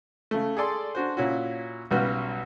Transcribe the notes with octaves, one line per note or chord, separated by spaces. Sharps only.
C#3 A3
G#4 A4 D5 C6
D4 F#4 C5
A#2 C#4 E4 F#4
B1 C#3 G3 B3 F#4 F6